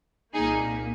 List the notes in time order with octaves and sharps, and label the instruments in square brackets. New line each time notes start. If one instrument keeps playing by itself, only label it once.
[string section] C2 A#2 A#3 D#4 G#4